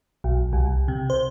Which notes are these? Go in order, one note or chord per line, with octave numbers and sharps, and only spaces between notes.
B1
C2
C3
C5